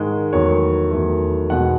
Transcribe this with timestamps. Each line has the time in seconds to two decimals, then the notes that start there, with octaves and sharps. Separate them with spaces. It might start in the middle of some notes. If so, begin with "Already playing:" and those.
Already playing: G#2 D#3 G#3
0.32 E2 D#3 F#3 A3 C#5
0.91 E2 D#3 F#3 A3
1.50 E2 B2 G#3 F#5